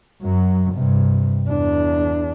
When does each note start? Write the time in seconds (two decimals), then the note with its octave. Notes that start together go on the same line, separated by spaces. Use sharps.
0.22 F#2 F#3
0.73 G2 C3
1.48 E2 D4